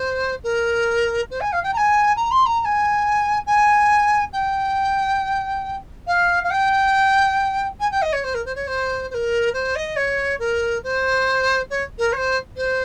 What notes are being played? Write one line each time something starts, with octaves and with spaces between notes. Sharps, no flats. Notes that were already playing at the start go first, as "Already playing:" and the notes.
Already playing: C5
A#4
C5
G#5
F5
G5
A#5
G#5
A#5
C6
A#5
A#5
G#5
G#5
G5
F5
F5
G5
G#5
G5
D#5
C#5
C5
A#4
C5
C#5
C5
C5
A#4
C5
D#5
C#5
A#4
C5
C#5
A#4
C#5
C5
C5